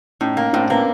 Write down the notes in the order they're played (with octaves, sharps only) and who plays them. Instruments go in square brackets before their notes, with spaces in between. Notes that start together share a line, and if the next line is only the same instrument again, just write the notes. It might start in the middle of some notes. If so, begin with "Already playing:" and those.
[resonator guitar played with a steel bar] A2 [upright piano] C#4 D#4
[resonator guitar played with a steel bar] A#3
[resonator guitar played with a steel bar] A2 [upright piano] C4 D4
[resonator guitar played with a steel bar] A#3 [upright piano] B3 C#4